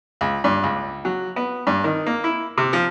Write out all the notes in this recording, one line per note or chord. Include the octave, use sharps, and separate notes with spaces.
C#2
G2
C#2
F#3
B3
G2
D#3
A#3
E4
C3
F3